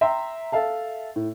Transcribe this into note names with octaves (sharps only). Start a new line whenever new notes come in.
E5 G5 A#5 C6
A4 E5 F5 A5
A2